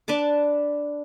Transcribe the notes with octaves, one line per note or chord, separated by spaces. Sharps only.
D4 B4 A5 D6